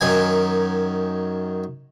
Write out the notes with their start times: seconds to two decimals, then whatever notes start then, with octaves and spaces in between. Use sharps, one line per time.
0.01 F#2 D#3 G#5